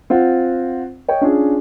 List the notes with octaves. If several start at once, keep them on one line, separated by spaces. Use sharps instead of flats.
C4 F4 F#5
C#5 D#5 G5
C#4 D4 F4 G#4